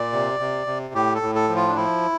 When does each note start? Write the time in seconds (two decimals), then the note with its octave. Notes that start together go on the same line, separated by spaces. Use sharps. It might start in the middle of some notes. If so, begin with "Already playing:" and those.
Already playing: A#2 D5
0.13 C3
0.40 C3
0.67 C3
0.94 A2 G4
1.15 A4
1.22 A2
1.35 A4
1.49 F3
1.56 F4
1.68 D4
1.76 F3 E4